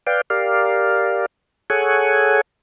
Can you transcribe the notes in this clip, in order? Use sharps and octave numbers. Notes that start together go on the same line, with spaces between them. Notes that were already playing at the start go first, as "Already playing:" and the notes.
B4 D5 F5 G5
G4 A#4 D5 F5
G#4 A4 C#5 F#5 G#5